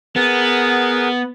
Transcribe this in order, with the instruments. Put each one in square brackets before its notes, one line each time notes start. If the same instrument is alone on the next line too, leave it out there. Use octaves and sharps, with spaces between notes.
[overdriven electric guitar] B3 [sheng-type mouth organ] G#4 A#4 F#5